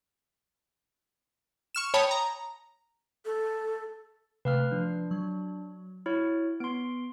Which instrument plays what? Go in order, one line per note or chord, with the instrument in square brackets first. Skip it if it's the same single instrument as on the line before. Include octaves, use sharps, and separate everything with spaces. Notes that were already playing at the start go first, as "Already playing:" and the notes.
[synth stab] C#6 F6 E7
C#5 G5 A5 B5 D#6
A#5
[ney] A4
[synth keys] C3 A3 [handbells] B4 F5 F6
[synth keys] F3 [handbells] D4
[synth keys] F#3
[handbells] E4 C#5 [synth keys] F#4
[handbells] B3 C6 [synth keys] D7